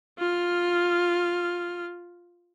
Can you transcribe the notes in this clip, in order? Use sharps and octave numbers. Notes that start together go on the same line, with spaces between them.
F4 F6